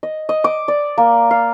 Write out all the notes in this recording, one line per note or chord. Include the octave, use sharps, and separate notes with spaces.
D#5
D#5
D6
D5
A#3
F5